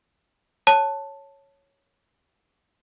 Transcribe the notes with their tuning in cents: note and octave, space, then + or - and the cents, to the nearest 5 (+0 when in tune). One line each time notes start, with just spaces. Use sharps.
C#5 +0 A5 +0